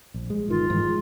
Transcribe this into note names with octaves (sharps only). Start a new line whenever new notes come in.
A#1
G#3
G1 D#3 F4
G#2 E3 F3
G#3